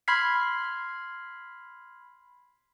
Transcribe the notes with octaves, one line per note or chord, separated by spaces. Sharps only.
B5 C6 F6 G#6 B6 C7